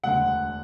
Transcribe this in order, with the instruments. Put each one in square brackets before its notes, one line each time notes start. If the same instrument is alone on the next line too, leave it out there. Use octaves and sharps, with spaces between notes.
[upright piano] E1 D2 D3 F#5